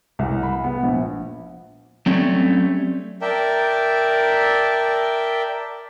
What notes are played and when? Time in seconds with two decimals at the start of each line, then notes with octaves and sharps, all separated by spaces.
0.19 C2
0.43 B5
0.64 B3
0.83 A#1
2.06 F#3 G3 A3 C4 C#4
3.22 A#4 D5 E5 G5 A5